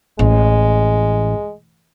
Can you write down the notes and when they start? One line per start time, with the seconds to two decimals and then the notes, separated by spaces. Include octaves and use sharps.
0.19 A1 G#3